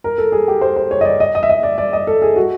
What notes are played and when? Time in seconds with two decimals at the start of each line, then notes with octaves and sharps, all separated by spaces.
0.04 A#4
0.18 A4
0.32 G#4
0.48 G4
0.61 C5
0.76 C5
0.91 C#5
1.01 D#5
1.05 D5
1.20 D#5
1.35 D#5
1.43 E5
1.50 D#5
1.63 D5
1.78 D5
1.93 D#5
2.07 A4
2.22 G#4
2.36 F#4